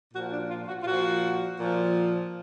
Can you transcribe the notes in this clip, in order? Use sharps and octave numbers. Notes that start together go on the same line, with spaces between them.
A#2 F3 F#4
D4
F4
F#4
F4
A#2 F3 F#4
A#2 F3